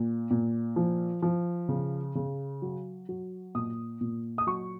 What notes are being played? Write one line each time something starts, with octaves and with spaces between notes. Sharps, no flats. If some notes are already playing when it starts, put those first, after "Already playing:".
Already playing: A#2
A#2
F3
F3
C#3
C#3
F#3
F#3
A#2 D#6
A#2
D#6
F#3 C#6